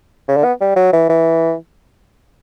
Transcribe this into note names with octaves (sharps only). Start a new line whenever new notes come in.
C#3
D3
B3
G3
F#3
E3
E3